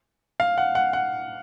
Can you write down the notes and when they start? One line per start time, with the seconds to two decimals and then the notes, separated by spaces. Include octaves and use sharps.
0.40 F5
0.58 F#5
0.75 F#5
0.93 F#5